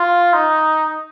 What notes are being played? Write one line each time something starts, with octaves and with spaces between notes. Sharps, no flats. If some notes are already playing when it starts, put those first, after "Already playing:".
Already playing: F4
D#4